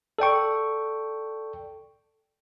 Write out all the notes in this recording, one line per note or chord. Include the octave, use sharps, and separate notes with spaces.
A4 D5 G5 C#6